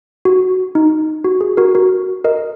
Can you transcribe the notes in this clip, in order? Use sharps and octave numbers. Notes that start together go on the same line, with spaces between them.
F#4
D#4
F#4
G#4
F#4 A#4
F#4 A#4
A#4 D#5